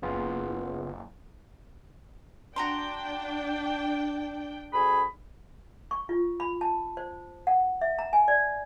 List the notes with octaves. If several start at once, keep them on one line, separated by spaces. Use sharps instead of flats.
F#1 C#3 B3 F4
D4 F#4 G5 A#5 C6
D2 G#4 B5
C#6
F4
B5
A5
C5
F#5
E5
A#5
G#5
D5